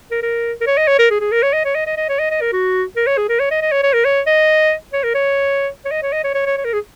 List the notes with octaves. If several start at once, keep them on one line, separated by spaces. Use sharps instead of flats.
A#4
A#4
A#4
C#5
D#5
C#5
A#4
G#4
G#4
A#4
C#5
D#5
C#5
D#5
D#5
D#5
C#5
D#5
D#5
A#4
F#4
A#4
C#5
G#4
A#4
C#5
D#5
D#5
C#5
C#5
A#4
C#5
D#5
C#5
A#4
C#5
C#5
D#5
C#5
D#5
C#5
C#5
C#5
C#5
A#4
G#4